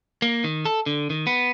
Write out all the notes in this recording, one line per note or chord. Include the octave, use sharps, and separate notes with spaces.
A#3
D#3
A4
D3
D#3
B3